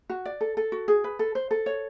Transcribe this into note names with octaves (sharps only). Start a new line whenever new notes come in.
F#4
D5
A4
A4
F#4
G#4
B4
A4
C5
A4
C#5